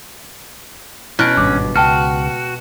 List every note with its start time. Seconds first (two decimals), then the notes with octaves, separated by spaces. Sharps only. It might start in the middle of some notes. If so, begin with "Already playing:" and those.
1.19 B2 C#4 E4 F6 F#6 D7
1.37 G#1 G2 D6
1.76 C#2 F#4 G5 A5 F6